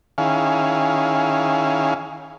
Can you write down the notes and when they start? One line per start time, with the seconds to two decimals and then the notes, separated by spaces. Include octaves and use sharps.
0.18 D#3 C#4 E4 G#4 F5